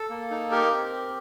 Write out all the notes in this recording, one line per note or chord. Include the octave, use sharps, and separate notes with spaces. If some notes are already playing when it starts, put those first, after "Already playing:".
Already playing: A4
A#3
D#4
G4 A#4
C4
G4